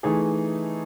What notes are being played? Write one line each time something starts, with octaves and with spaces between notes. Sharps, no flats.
E3 A3 D#4 G#4